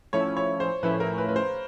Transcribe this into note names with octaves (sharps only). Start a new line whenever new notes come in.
A2 F3 A3 C#4 E4 C#5
C#5
C5
A2 F3 A3 C#4 E4 B4
A#4
B4
B4
C5